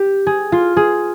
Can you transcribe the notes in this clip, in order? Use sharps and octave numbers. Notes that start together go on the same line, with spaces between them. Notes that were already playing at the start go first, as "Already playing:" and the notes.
Already playing: G4
G#4
F4
G#4